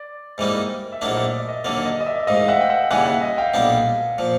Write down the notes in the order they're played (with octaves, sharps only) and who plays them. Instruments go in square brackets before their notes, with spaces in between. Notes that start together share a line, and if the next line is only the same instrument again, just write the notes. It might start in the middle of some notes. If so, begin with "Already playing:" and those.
Already playing: [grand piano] D5
[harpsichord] G#2 E3 G3 A#3 D#4
[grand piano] E5
[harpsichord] A#1 A2 F#3 A#3 D4 [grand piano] D#5
[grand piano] D5 E5
D#5
D#5
[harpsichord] D#2 D3 F#3 A#3 [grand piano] D5
[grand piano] D#5
D#5
D5 E5
E5
[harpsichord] A1 G#2 D#3 [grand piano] D#5 F5
[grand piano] E5 F#5
G5
E5 F#5
[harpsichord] D#2 C#3 E3 G3 [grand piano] F#5 G#5
[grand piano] E5 F#5
D#5
F5 G5
[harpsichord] B1 A#2 G3 B3 D4
A#2 F3